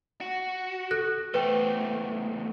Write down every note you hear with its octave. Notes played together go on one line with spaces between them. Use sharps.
F#4
A4 F#6 A#6
E2 A3 B4 C5 G5